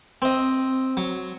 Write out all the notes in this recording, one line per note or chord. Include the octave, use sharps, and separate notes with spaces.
C4 D#5
F#3